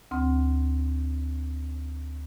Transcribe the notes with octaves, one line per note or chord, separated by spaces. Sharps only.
D2 C4